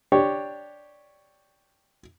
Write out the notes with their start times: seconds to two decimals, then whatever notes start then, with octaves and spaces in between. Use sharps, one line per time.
0.12 D4 G4 C#5